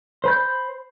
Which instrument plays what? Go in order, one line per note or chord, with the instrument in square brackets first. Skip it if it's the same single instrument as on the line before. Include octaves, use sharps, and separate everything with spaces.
[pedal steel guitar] C5 B5 G6